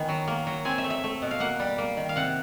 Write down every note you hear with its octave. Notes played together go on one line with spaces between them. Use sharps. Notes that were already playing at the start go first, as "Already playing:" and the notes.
Already playing: D#3 B3 G#5
F#3
A#3
F#3
C4 G#5
E5
A3
E5
A3
B2
F5
A#3 F#5
G3
A#3
D#3
F5
C3 F#5